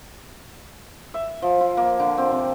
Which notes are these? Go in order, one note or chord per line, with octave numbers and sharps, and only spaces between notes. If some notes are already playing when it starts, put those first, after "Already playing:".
E5
F3
F4
A#3
D3
C4
C3